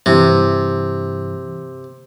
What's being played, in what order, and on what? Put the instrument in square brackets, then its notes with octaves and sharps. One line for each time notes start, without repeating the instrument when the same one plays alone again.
[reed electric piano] G2 E3 [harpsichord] C3